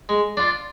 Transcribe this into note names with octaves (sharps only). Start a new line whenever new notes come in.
G#3
D4 F4